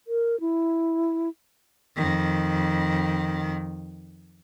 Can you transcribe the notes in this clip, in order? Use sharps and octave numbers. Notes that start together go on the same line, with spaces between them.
A#4
E4
F2 D#3